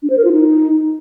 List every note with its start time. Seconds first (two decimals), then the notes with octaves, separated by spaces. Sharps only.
0.02 D4
0.10 C5
0.17 A#4
0.25 F4
0.32 D#4